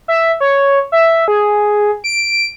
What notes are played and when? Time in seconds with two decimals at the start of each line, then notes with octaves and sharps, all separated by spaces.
0.08 E5
0.40 C#5
0.92 E5
1.28 G#4
2.04 D7